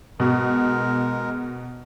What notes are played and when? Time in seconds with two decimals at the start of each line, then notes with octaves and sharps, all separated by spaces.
0.20 B2 G#3 A#4